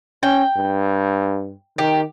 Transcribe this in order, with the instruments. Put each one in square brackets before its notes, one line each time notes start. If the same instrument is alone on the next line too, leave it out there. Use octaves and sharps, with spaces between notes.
[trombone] C#4 [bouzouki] G5
[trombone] G2
[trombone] D#3 [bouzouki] G4